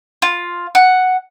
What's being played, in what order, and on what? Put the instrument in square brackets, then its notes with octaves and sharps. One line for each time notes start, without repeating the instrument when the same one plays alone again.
[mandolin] F4
F#5